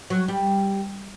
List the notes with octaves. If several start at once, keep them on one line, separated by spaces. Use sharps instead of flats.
F#3
G3